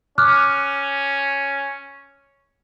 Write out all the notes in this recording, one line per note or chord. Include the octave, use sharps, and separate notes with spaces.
C#4 D6 F6 F#6